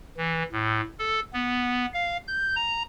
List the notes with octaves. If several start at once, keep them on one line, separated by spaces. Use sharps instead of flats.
E3
A2
A4
B3
F5
G6
A#5